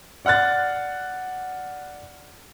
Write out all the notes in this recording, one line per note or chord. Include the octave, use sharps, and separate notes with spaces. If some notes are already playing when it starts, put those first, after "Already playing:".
D5 F#5 F6 F#6 A6